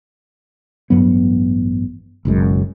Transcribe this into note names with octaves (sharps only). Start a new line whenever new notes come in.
A1 G2 F#3 B3
F#1 B1 F#2 G#3